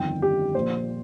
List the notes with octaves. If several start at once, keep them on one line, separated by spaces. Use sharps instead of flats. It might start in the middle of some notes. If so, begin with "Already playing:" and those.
Already playing: G1 F2 D#3 G5
G4
A#1 A#2 C5